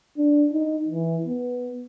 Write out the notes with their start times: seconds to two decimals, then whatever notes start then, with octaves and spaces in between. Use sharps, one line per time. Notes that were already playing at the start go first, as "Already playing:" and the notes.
0.18 D4
0.52 D#4
0.88 E3
1.26 B3